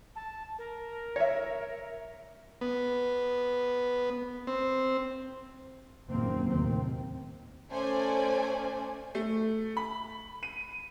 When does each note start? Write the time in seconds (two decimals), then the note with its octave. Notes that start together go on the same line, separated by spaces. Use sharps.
0.16 A5
0.58 A#4
1.16 C#5 E5
2.61 B3
4.47 C4
6.08 F#1 F#2 A#2 D#3 A#3 C4
6.48 D#2 A2 C3 D#3 C4
7.71 A3 C#4 C5 D5 G#5
9.15 A3
9.77 B5
10.43 D#7